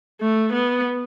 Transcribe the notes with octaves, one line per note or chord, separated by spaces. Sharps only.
A3
B3